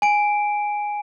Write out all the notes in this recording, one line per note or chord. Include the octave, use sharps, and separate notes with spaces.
G#5 D7